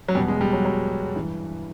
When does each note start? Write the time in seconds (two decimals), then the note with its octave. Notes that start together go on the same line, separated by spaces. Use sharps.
0.08 F#3
0.15 E2 B2 G3
0.28 G#3
0.41 G3
0.53 F#3
0.65 F#3
1.15 G2 E3